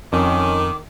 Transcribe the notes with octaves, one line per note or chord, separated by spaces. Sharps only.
F2 D#3 C#4 D6